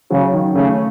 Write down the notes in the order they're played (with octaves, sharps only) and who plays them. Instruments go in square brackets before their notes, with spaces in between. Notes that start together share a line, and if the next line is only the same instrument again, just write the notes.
[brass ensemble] C#3 [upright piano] F#3
[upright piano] D#3
[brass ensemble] C#3 [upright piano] A3